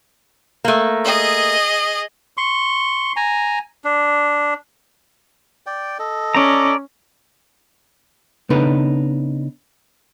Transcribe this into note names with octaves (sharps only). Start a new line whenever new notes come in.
A3 A#3
G#4 D#5
C6 C#6
G#5 A#5
D4
D5 G5
A4 D#5
C#4 D5 A#5
C#3 B3 D4 D#4 A4 B4